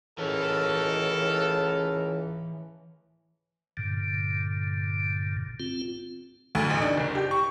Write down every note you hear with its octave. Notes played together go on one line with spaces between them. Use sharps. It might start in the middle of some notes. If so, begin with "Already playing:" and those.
C#2 B2 E3 C#4 A4 A#4
G2 A#2 D3
C4 F4
D2
A1
D4
F#1
G4
C#6